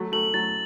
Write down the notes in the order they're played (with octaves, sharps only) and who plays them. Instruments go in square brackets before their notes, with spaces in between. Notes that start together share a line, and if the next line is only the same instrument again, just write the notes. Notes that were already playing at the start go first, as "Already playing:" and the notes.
Already playing: [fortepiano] F#3 A3
[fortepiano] F#3 A3 [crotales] F#7
[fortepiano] F#3 A3 [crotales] A6